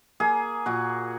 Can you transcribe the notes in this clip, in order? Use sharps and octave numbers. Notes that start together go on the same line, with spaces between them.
A#3 G#4
A#2 F#4